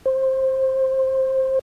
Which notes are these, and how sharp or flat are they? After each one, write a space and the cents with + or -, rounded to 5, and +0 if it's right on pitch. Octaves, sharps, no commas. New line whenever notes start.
C5 +15